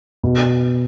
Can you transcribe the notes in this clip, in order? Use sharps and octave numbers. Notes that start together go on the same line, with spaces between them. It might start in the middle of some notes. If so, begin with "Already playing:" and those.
B2